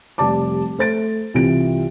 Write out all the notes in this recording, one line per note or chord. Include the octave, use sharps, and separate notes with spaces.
F1 G3 D5 A5 D6
A3 C5 A6 D7
C2 C3 E3 F4 D7